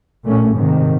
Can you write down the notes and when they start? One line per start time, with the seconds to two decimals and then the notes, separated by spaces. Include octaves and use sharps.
0.24 A#2 A3 C#4
0.55 G#2 C3 D#3